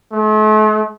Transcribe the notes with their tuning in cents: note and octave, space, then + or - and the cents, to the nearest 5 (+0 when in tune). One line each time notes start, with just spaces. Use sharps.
A3 -45